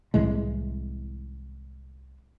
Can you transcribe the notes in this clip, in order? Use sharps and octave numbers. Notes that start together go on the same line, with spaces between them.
C2 A2 E3 G#3